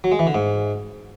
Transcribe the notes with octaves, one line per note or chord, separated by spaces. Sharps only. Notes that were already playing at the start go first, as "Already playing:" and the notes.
F#3
G#3
E3
D3
G#2